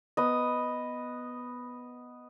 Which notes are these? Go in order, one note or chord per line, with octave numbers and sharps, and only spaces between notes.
B3 D#5